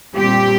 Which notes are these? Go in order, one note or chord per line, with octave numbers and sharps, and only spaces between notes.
A#2 G3 C4 G4